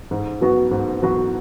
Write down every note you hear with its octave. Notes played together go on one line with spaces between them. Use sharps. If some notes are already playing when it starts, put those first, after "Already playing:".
G#2
F#3 B3 F#4 B4
G#2
F#3 B3 F#4 B4